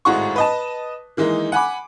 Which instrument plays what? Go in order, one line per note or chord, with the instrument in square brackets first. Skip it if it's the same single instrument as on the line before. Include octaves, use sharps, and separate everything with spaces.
[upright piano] G#1 A2 G#3 F#4 C#6
B4 D#5 A5
D#3 E3 G#3 A#3 D#4
F#5 G#5 B5 D6